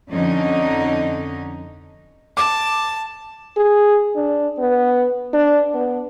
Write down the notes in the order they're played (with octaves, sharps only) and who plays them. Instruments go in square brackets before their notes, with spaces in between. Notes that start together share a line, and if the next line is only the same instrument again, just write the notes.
[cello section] F2 D3 C#4 D#4 D#5
[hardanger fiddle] A5 [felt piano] D6
[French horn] G#4
D4
B3
D4
B3